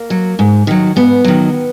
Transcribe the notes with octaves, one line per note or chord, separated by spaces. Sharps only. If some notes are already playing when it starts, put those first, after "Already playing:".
Already playing: A#3
F#3
G#2
D#3 F#3
G#2 B3
D#3 F#3